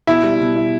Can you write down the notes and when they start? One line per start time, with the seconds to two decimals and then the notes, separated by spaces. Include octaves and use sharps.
0.07 B2 E4
0.24 G3
0.40 B2
0.56 E4